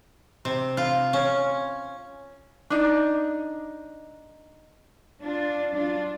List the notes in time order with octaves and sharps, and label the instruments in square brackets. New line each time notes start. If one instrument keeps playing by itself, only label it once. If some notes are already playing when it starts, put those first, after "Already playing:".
[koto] C3
F4
C#4
[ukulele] D4 D#4
[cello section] D4 F4
F#3 D4 F4